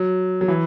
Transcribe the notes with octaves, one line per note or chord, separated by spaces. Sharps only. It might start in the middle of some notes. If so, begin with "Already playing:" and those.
Already playing: F#3
F#3
E3